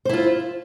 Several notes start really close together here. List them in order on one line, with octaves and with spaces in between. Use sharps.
C5 E4 F4